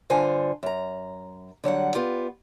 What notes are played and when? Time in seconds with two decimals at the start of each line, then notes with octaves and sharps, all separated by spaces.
0.10 G2 D3 F4 C5 G#5 A5
0.63 F#2 A#5
1.64 D3 F#3 G3 F#5
1.94 B3 F4 G4